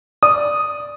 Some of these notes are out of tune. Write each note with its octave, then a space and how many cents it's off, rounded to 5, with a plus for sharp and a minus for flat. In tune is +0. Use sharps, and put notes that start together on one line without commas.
D5 +0 D#6 -5